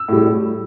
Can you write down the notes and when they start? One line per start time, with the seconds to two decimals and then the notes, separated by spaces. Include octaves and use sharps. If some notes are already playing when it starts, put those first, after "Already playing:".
Already playing: E6
0.08 A2 G3